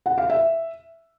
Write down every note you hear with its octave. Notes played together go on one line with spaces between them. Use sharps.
F#5
F5
E5